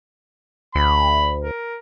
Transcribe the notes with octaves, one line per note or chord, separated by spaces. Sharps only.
D2 B5
A#4